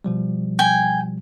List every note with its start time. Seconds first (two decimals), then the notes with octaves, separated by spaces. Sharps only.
0.04 B2 F3 G3
0.59 G5 G#5